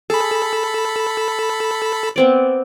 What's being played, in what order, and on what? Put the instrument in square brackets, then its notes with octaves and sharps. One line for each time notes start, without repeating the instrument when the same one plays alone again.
[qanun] G#4 [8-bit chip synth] A4 B5
[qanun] B3 C4 D5